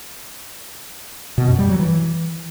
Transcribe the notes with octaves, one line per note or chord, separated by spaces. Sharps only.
B2
F#2
G3
F#3
E3